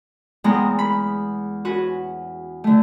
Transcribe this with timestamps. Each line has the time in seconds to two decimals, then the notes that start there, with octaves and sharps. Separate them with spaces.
0.44 E2 G#3 B3 C4 A#5
0.79 B5
1.65 C#4 F#4 B4
2.64 D3 A3